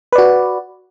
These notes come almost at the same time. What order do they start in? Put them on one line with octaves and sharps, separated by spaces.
B4 D5 F#4